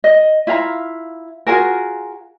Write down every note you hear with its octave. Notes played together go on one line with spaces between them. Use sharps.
D#5
E4 F4 F5 A#5
F4 F#4 G#4 A#4